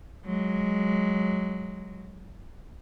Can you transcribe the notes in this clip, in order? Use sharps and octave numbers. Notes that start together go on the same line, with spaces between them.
F#3 G#3